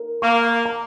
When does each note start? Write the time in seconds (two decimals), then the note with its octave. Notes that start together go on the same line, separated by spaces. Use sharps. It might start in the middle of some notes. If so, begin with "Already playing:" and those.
Already playing: A#4
0.22 A#3 C#6
0.66 A#5